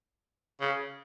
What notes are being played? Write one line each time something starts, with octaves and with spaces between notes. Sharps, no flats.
C#3